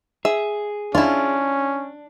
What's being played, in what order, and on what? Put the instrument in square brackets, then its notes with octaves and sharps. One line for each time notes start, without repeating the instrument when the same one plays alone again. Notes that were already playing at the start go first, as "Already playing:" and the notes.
[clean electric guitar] G#4 [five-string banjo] E5
[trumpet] C#4 [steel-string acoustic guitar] D4 [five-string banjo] E4 F4